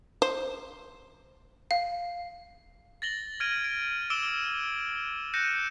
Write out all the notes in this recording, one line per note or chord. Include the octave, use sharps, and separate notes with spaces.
C5
F5
A6 A#6 F#7 G7
F6 G#6 A#6 D7 D#7
D7
D6 E6 D7 E7 G7
F#6 G6 A#6 C#7 D#7 E7